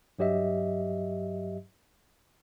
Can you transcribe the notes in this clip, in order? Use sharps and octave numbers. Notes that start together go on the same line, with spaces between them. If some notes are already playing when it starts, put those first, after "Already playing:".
G2 F#3 G4 D#5 E5